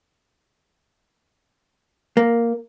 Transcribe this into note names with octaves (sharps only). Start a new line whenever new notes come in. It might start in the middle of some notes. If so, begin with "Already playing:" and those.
A#3